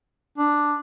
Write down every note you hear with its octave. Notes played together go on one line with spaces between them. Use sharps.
D4